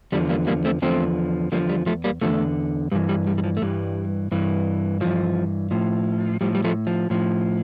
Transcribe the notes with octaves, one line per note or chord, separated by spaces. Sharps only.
E2 D3 F3 G3
G3 A#3
G3 A#3
A3 C4
E2 D3 F3 A3 C4
E2 D3 F3 G3 A#3
G3
F3 A3
G3 A#3
E2 D3 F3 A3
G2 E3 G3
G3
G3
G3
F3
A3
G2 E3 G3
G2 E3
G2 E3 F3
A2 F3
A2 F3 G3
G3
F3 A3
F3
A2 F3